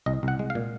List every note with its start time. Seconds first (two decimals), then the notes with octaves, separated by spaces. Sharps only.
0.06 C2 D#5
0.23 C2 F#5
0.39 G#3
0.50 F5
0.55 A#2